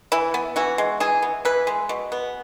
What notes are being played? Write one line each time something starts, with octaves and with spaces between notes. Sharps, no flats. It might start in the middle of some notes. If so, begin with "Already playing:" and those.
E3 E4
B3
E3 F#4
G#3
E3 G#4
B3
E3 B4
G#3
B2
B3